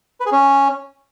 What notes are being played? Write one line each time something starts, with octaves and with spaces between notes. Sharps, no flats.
B4
G#4
C#4